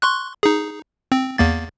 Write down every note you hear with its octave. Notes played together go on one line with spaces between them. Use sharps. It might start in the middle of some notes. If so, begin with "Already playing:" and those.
C6 C#6 F#6
D#4 G#4
C4
E2 A#3 A6